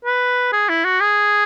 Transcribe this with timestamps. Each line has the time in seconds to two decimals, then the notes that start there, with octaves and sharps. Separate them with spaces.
0.05 B4
0.53 G#4
0.69 E4
0.85 F#4
1.01 G#4